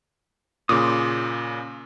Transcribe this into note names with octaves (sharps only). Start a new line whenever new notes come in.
A#2 C#3 C6 D6 D#6